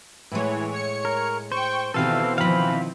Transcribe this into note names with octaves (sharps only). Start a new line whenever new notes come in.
A2 E3 G#3 C#5
C#5 C#7
A#4
C5 G5 C#6
B2 D#3 E3 C4 G4 A4 B4 F5
D#3 F3 F5 B5